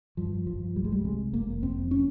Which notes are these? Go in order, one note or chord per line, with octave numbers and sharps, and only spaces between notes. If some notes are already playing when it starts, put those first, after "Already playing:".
G2 F3
G2 F3
C2 G3
G#3
G3
C3 G#3
F1 A#3
F2 C4
C#4